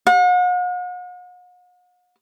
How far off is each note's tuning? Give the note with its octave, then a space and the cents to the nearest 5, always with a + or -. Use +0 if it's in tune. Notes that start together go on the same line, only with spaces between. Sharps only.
F#5 -45